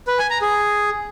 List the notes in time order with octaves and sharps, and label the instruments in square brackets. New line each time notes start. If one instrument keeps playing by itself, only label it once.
[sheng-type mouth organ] B4
G#5
A#5
G#4